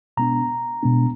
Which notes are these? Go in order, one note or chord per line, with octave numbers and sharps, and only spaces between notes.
B2 G#3 B3 D4 A#5
B2 G#3 B3 D4